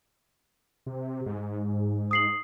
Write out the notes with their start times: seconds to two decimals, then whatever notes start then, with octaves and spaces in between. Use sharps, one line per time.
0.86 C3
1.26 G#2
2.11 D#6 C7 F#7